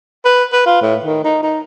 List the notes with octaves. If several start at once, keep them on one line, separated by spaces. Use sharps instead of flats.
B4
B4
F4
A2
D#3
D#4
D#4